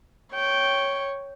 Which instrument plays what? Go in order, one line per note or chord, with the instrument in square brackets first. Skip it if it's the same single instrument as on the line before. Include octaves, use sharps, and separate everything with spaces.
[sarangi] C#5 [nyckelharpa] G5